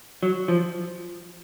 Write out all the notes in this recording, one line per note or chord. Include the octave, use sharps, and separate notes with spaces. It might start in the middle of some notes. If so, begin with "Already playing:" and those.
F#3
F3